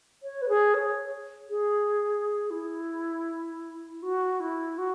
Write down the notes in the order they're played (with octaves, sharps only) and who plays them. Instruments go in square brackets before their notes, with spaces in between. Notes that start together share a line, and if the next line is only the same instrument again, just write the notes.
[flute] C#5
B4
G#4
C#5
G#4
E4
F#4
E4
F#4